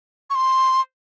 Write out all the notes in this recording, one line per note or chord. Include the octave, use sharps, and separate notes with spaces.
C#6
C6